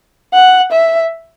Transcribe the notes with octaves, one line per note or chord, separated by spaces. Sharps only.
F#5
E5